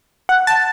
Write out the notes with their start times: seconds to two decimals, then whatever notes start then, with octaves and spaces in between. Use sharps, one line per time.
0.29 F#5
0.47 A5